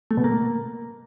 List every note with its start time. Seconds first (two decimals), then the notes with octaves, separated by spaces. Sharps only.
0.11 A3
0.17 B2
0.24 A#3